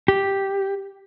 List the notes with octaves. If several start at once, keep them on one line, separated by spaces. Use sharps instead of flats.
G4